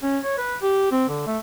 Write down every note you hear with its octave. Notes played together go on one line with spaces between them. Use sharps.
C#4
C#5
B4
G4
C4
D3
A3